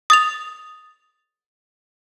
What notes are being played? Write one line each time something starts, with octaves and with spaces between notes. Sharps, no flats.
D#6 A6 F7